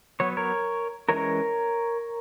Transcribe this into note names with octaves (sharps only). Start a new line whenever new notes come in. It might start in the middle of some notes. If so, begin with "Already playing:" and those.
F#3 B3 C#5
A#4 C#5
E3 G#3 C#4 A#4 C#5